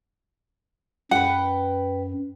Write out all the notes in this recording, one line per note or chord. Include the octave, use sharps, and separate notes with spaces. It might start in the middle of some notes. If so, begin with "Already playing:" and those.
F#2 B4 F#5 G5